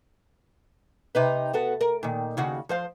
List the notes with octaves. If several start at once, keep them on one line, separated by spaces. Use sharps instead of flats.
C3 D#4 B4
B3 F#4 A4
A#4
A#2 D#3
D#2 C#3 F#4
F3 C5 F5